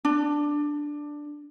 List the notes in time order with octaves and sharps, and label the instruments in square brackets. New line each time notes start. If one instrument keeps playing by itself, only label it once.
[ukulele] D4